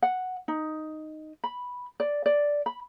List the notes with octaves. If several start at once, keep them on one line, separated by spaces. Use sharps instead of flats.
F#5
D#4
B5
D5
D5
B5